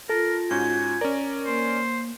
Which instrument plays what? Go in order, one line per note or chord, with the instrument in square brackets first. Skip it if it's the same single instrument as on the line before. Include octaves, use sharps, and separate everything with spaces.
[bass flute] F4 [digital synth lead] A4 [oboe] A#4
[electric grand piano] G#2 C#4 F#4 [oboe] G#5 [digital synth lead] G6
[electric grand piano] C#4 D5 [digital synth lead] A#4
[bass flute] A#3 [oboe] C5